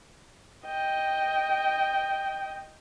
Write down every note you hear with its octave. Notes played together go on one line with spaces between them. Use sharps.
D#5 G5